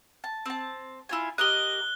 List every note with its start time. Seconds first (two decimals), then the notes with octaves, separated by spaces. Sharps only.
0.24 A5
0.46 C4 A5
1.09 E4 F4 G#5
1.38 G4 A#4 D#5 F#6 G7